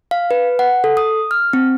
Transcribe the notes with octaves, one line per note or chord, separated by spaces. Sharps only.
F5
B4
F#5
A4
D#6
F6
C4